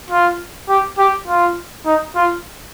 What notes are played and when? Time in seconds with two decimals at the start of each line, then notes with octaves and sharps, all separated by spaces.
0.10 F4
0.69 G4
0.98 G4
1.27 F4
1.86 D#4
2.16 F4